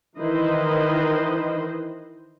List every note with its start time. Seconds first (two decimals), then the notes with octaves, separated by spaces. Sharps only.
0.19 D#3 E3 E4 B4 C5 D#5